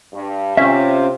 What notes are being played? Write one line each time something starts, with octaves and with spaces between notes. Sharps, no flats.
G2
C3 C#4 F4 C5 E5 F5